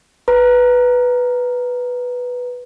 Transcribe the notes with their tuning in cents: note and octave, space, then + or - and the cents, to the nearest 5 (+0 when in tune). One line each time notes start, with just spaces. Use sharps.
B4 +0 A#5 +0